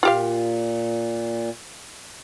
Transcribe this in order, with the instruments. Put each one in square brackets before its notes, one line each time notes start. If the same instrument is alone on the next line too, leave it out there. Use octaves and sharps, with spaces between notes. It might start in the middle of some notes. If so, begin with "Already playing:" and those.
[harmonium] A#2 [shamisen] F4 G4 F5